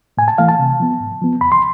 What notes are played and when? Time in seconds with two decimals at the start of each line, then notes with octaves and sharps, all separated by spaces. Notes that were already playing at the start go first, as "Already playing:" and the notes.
0.17 A2 G#5
0.28 A5
0.38 E3 A3 F5
0.48 A5
0.59 C3
0.80 F3 B3
1.00 G#2
1.22 F3 B3
1.41 E2 B5
1.52 C6